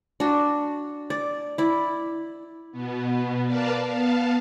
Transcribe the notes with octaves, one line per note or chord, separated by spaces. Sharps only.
D4 F#4
D5
E4 D5
B2 B3
A#4 B4 D5 F5 A5
B3 F5 A5